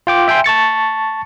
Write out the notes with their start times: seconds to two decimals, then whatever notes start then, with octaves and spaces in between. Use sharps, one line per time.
0.07 F4 G5 D6
0.28 E5 G5 G#5 C6
0.44 A5 C#6 A6 C#7